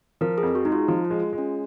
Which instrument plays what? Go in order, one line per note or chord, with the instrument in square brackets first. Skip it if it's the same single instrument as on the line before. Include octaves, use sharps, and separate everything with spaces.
[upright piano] F3 [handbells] A#4
[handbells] G#4
[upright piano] F2
[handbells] F#4
[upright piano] G#3 [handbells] D#4
[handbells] F4
[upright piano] F3 [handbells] F4
[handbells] F4
[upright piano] G#3
[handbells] F4
[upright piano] G#3
[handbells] C#4